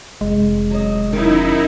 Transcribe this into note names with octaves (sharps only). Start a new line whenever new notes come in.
F1 G#3
F#3 D#5
F#2 D#3 D#4 E4